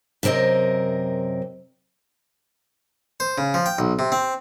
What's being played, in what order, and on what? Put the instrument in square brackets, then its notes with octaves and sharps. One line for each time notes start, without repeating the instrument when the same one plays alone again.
[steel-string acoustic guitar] F#2 C3 C4 A#4 D#5
[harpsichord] C5
C#3
F3
G5
B1
C3
C4